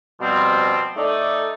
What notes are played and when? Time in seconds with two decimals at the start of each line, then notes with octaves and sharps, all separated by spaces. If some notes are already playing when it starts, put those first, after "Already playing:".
0.20 B2 F3 G3 C4
0.97 A3 D#4 D5